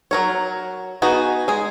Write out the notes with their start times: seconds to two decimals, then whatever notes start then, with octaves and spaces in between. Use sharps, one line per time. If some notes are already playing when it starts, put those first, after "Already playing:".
0.11 F#3 A#4 C#5
1.02 B3 D#4 F#4 G#4
1.48 G#3 G#4